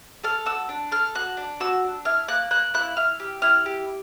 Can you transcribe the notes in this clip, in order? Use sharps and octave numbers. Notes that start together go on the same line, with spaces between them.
A4 F6
F#4 E6
D4
A4 F6
F#4 F#6
D4
F#4 E6
D4
E4 F6
A#3 F#6
A#3 F#6
E4 F#6
E4 F6
G4
E4 F6
G4